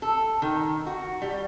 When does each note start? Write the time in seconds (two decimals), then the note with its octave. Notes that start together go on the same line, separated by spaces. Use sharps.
0.02 A4
0.42 D#3
0.87 F#4
1.22 G3